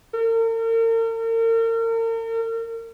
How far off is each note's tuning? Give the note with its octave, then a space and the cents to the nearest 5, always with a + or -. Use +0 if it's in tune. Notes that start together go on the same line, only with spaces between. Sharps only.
A#4 -40